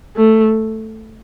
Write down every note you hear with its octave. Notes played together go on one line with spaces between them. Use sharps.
A3